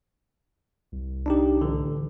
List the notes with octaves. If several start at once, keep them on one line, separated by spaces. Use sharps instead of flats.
C2
D4 D#4 G4
A1 D3